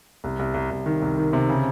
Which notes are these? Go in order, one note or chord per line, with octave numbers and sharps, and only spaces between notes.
C2
C2
C2
C2
D#3
C2
D#3
C3
C#3